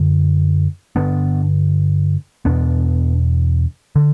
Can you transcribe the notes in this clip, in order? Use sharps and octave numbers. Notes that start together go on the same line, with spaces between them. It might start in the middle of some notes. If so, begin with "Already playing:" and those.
Already playing: F#2 D3
G2 D3 B3 D4
E2 B2 B3 D4
D3